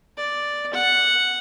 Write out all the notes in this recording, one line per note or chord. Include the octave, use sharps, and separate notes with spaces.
D5
F#5